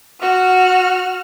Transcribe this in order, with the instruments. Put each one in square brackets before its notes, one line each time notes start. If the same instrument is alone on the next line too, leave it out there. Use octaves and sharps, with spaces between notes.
[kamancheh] F#4 F6